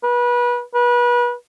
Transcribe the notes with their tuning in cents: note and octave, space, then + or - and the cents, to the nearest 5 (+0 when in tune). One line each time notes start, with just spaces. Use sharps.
B4 -30
B4 -30